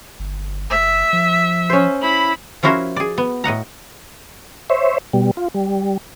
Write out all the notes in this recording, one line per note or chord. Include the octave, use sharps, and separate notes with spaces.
G1
F#1 E5
F3
C#4 C5
E4 B5
F3 C#4 E4 F#4 A#4 C5
G#4 D5
B3
A2 D#5 F#5 A#5
C5 C#5 E5
B2 G3
F4
G3